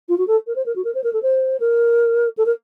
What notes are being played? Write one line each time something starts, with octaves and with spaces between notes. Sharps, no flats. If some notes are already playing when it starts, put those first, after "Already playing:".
F4
F#4
A4
A#4
C5
A#4
F#4
A#4
C5
A#4
A4
C5
A#4
A4
A#4